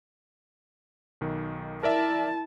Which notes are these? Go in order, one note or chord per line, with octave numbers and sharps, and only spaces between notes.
B1 D#3
E4 A#4 D5 E5 A5